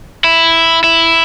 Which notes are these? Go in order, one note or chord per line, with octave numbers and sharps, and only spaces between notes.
E4
E4